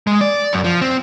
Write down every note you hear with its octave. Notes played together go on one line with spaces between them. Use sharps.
G#3
D5
F#2
F3
C4